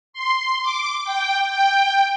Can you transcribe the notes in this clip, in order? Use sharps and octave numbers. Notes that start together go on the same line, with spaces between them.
C6
D6
G5
G5